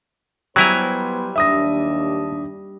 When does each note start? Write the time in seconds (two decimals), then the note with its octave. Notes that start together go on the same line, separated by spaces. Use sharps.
0.56 F#3 G3 B3 E4 B4 C5 G#5 A#5
1.36 D#2 D4 E5 D#6 A#6